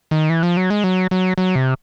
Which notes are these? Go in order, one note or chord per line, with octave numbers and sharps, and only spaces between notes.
D#3
E3
F3
F#3
G#3
F#3
F#3
F#3
C3